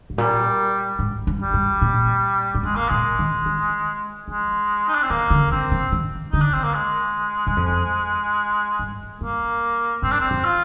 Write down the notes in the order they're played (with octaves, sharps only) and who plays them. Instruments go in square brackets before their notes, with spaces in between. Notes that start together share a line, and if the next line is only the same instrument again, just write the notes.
[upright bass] G#2
[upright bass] A#2 [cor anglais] G3
[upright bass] G#2
G2
[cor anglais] G3
[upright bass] G2
A#2
G2
[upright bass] G#2 [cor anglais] G#3
[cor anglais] A#3
[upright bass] A#2 [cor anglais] G#3
[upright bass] D#3
D#3
[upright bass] F3 [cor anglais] G#3
[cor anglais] D#4
D4
C4
[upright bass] D#3 [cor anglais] A#3
[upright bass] D3
[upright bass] D#3 [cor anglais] C4
[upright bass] F3
D#3
[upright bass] D3 [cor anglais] D#4
[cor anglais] D4
C4
A#3
G#3
[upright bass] G2
F2
G2
[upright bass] G2 [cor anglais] A#3
[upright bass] G2 [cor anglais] C4
[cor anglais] D4
C4
[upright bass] F2
[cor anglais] F4